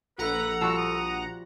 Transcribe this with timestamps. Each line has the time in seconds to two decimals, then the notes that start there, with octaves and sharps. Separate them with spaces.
0.18 A#1 A4 B4 F#5 A#5
0.61 F3 G3 F#4 E6
0.78 D#6